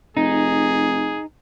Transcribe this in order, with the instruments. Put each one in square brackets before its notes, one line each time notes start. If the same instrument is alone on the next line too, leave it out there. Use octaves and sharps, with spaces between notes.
[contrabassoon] F1 [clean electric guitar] D#4 [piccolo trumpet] G#4